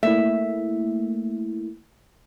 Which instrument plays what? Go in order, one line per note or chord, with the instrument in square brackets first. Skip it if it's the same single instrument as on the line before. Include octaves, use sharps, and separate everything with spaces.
[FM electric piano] A3 A#3 E4 [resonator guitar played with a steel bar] E5